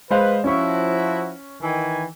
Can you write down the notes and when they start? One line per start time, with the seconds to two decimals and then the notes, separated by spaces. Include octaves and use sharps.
0.10 G#3 B4 C5 F5
0.44 F3 C#4 E4 F#4 C#6
1.61 D#3 E3 G#5